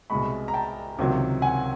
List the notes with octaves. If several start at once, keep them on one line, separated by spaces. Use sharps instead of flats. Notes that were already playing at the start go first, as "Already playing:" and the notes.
C2 B2 G#3 B5 C#6
A#5
G5 A5
C#2 C3 D#3 F#3
F#5 G#5